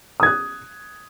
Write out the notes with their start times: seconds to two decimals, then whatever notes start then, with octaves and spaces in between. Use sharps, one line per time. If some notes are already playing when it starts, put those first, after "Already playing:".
0.20 D#6
0.23 G#6
0.26 F#6